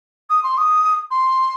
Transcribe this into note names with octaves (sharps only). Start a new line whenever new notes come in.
D#6
C6
D#6
C6